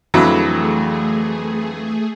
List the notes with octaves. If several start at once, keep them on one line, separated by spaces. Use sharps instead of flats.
F2 D3 E3 F#3 A3 G#4 B4